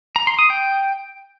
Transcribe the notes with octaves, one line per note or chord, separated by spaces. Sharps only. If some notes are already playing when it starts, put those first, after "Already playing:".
A#5
C6
D#6
G5